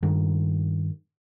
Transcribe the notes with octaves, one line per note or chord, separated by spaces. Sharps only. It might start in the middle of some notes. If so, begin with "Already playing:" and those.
G2 D#3